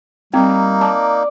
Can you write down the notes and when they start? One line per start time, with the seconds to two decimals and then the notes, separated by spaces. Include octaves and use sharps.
0.34 G3 A#3 C4 D#4
0.81 D5 A5